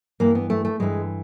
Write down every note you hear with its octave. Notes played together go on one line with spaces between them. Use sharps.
G2 E3 A#3
B3
A3
A3
G2 E3 G#3